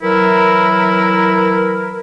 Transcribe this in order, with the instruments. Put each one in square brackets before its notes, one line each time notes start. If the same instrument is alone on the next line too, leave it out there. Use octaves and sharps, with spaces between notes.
[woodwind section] E3 F#3 E4 A#4